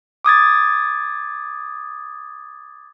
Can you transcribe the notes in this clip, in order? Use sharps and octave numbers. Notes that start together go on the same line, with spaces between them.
D6 D#6 G#6 A6